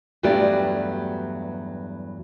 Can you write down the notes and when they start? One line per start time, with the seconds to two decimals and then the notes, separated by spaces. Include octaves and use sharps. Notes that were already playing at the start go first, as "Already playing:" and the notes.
0.23 E2 G2 F#3 A3 G4 D5